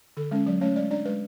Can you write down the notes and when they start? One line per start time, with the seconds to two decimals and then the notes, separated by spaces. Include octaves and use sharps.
0.17 D3 A4
0.31 G#3 C#4
0.46 F#3 D5
0.61 A3 C#4 C#5
0.76 G#3 D5
0.91 D4 D5
1.05 G#3 B4